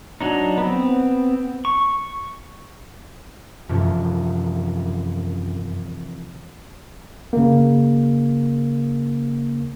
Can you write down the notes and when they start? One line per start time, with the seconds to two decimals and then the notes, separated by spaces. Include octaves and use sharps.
0.21 F#3 D4 D#4
0.58 B3 C4
1.65 C#6
3.69 F#2 C3 E3 F3
7.33 C#3 A#3